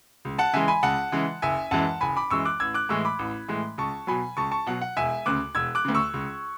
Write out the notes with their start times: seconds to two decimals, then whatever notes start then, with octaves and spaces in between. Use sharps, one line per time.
0.25 C#2
0.38 F#5 A5
0.53 C#3 E3 G#3 E5 G#5
0.68 G#5 B5
0.83 C#2 F#5 A5
1.12 C#3 E3 G#3
1.42 F#1 E5 G#5
1.71 F#2 E3 G#3 F#5 A5
2.01 F#1 G#5 B5
2.17 B5 D6
2.30 F#2 E3 G#3 C#6 E6
2.45 D6 F#6
2.60 A1 E6 G#6
2.74 D6 F#6
2.89 A2 E3 G#3 C#6 E6
3.05 B5 D6
3.19 A1
3.48 A2 E3 G#3
3.78 C#2 A5 C#6
4.07 B2 F#3 G#5 B5
4.37 C#2 A5 C#6
4.51 A5 C#6
4.67 B2 F#3 F#5
4.81 F#5
4.97 E1 E5 G#5
5.26 D2 C#3 D6 F#6
5.55 E1 E6 G#6
5.75 D6 F#6
5.85 D2 C#3
5.95 C#6 E6
6.14 C#2